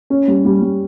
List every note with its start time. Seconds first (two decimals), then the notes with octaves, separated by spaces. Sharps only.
0.10 C#4
0.28 G3
0.45 G3
0.62 G3